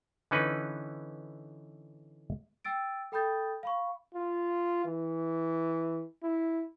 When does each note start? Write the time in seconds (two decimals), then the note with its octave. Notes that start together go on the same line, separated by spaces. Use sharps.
0.31 D3 E3 C#4 D#4 B4
2.65 G5 E6 A6 D7
3.12 A4 G5 B5 D#6 G6 A6
3.63 F5 B5 C#6
4.15 F4
4.85 E3
6.23 E4